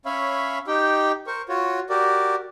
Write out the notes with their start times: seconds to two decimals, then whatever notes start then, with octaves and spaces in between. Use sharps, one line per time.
0.06 C#4 C#5 E5 F5 B5
0.67 D#4 G4 G5
1.27 A#4 C5 C#6
1.49 F4 F#4 C#5
1.90 F#4 G4 A#4 D5